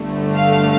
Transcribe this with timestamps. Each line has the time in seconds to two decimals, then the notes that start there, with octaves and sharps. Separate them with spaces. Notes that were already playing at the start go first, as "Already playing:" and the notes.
Already playing: G1 G2 D3 A3
0.35 F5